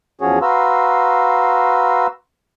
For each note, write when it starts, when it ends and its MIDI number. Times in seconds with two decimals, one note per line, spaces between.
0.21 0.39 40
0.21 0.39 53
0.21 0.39 61
0.21 0.39 66
0.21 0.39 68
0.21 0.39 73
0.42 2.07 66
0.42 2.07 71
0.42 2.07 77
0.42 2.07 82
0.42 2.07 84
0.42 2.07 88